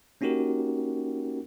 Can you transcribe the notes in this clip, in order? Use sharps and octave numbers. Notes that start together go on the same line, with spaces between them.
A#3 C#4 D#4 F#4 G4 A#4